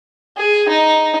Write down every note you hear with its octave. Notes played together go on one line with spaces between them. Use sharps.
G#4
D#4